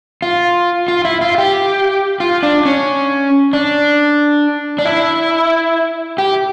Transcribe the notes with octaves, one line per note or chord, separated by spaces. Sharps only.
F4
F4
E4
F4
G4
F4
D4
C#4
D4
D4
E4
G4